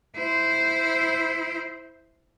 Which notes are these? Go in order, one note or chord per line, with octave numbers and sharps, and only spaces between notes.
E4 C5